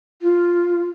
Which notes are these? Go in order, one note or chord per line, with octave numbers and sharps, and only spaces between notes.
F4